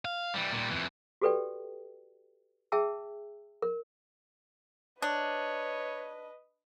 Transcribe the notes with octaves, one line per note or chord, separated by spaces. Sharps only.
F5
E3 G3
A#2 G3
F2 E3
F#4 G4 A4 B4 D5 G5
G#4 E5 G5 A5 E6
A#4
D4 B4 C#5 D#5